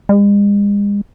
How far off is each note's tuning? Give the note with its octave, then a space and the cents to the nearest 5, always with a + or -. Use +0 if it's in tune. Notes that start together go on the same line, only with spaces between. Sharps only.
G#3 -40